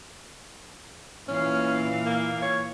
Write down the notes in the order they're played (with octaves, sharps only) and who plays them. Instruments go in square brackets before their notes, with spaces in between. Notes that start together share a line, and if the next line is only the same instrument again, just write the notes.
[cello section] A#2 E3 F5 [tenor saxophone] C#4
[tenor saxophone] A#3
C#5